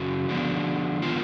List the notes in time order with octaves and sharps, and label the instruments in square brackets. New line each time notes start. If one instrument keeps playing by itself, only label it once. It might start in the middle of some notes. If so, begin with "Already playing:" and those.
Already playing: [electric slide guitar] F#2 C#3 E3 F#4
D3 F3 G#3 B3 D4
D#3 G#3 B3 F4